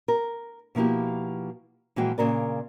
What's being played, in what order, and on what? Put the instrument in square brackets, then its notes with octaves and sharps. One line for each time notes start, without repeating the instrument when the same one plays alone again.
[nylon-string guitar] A#4
B2 F3 A#3 E4 G4
A#2 E3 F3 G#3 F#4 G5
A#2 C#3 A#4 D5